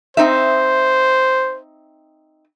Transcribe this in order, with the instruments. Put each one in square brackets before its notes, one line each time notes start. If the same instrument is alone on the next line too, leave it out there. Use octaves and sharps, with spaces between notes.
[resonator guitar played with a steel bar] C4 D#4 E5 [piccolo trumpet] C5